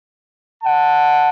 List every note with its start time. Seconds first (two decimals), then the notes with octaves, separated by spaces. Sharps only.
0.63 F#5 A5